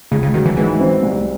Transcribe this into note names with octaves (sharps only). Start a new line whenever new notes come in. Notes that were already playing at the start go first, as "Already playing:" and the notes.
C#2 C#3
C#3
D#3 F#3
E3
G#2 E3
C4
C2